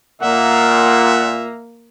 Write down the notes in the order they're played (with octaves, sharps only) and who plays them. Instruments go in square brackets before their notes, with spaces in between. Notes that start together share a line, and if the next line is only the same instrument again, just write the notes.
[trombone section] A#2 [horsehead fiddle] A#3 [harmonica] E5 [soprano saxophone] F#5